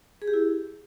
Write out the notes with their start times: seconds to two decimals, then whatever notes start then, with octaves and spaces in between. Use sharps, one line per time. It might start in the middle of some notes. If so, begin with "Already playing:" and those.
0.22 G#4
0.28 G4
0.33 E4